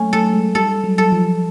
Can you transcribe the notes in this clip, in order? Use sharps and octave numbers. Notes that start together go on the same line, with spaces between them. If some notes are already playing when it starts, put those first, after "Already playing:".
Already playing: F#3 A3 A#3 C#4
A3 A4
G#3
G3 A4
F#3
A4
F3